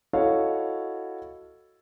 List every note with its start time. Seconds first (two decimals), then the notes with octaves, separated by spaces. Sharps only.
0.13 E4 F#4 A4 C#5 D#5 F5